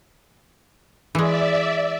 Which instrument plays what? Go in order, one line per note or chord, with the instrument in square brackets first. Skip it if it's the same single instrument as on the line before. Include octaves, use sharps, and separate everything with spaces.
[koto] E3 G#3 [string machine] D5 E5